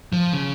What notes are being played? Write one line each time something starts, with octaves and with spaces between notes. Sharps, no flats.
F3
C#3